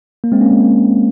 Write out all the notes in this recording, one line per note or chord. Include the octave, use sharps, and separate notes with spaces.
A#3
G#3 C4
A#3 C#4
G#3
A#3